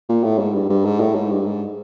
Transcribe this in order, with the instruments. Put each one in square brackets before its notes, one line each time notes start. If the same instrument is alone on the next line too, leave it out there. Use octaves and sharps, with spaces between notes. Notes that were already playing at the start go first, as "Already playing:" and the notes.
[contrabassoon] A#2
A2
G#2
G2
G2
G#2
A2
G#2
G2
G#2